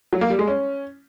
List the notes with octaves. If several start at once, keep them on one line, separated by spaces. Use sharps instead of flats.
F#3
A#3
G3
G#3
C#4